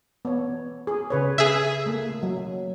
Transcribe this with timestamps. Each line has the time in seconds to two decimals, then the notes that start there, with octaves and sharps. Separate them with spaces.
0.25 B3 C#5
0.87 G#4
1.10 C#3 B4 C#5
1.38 G#4 E5
1.86 A3 A#3
2.23 F#3